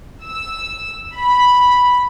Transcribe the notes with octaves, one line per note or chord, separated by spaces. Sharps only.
E6
B5